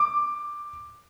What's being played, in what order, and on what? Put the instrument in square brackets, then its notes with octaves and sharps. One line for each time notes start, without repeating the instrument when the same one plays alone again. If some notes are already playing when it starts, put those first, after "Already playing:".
Already playing: [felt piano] D6